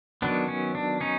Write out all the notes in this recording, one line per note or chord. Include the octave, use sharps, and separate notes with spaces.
D#3 F#3 B3 D4
C#4
D4
C#4 D#4